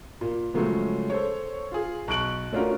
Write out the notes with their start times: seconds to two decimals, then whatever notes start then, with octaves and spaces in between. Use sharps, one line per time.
0.21 A#2
0.54 C#3 F3 F#3 G#3 A3
1.10 A4 C5 C#5
1.72 F4 G#4
2.08 B1 C#6 F#6 D7 F#7
2.52 A3 C#4 D4 F4 F#4 A#4